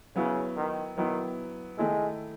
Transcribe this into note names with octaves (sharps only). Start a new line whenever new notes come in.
C#3 F#3 B3 E4
D#3
D#3 F#3 B3 E4
D#3 G#3 A3 E4